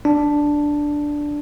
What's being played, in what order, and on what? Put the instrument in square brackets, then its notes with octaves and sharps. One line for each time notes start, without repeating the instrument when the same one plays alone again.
[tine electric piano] D4